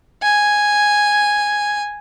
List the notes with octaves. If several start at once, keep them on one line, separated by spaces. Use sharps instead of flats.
G#5